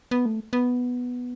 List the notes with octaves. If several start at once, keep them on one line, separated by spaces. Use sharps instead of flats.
B3
A3
B3